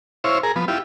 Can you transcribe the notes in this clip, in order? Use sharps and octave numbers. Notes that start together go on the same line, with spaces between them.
E4 C5 C#5 F5
G#4 A#4
F3 B3
E4 F4 G4